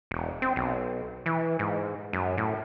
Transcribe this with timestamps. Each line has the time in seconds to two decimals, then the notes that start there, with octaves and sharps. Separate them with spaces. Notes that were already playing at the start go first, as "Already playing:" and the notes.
0.11 E1
0.42 C4
0.56 B1
1.26 E3
1.59 G#2
2.13 F#2
2.38 A2